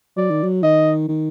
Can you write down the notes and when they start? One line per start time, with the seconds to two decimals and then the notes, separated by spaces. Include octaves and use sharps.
0.17 F#3 D5
0.30 D#3
0.43 F#3
0.63 D#3 D#5
1.08 D#3